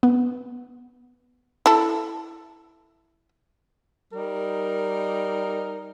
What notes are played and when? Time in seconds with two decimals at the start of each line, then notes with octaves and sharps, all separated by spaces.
0.03 B3
1.66 E4 A4
4.13 G3 D#4 A#4